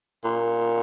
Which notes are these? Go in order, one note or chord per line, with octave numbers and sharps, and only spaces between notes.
A#2